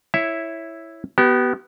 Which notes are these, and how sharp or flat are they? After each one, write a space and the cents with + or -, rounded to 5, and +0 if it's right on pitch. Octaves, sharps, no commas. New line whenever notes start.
E4 +0 C#5 -5 E5 +0
B3 +0 G4 -35